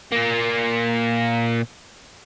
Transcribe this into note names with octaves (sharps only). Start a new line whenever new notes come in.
A#2 A#3